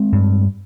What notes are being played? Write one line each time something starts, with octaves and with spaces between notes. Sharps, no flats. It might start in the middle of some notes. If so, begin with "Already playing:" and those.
Already playing: G#3 C4
G2